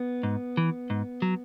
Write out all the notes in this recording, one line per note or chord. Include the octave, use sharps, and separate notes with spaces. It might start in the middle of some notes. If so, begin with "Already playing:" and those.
Already playing: B3
G#2
E3
G#2
F#3